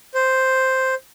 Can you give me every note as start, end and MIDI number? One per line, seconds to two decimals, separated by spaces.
0.15 0.95 72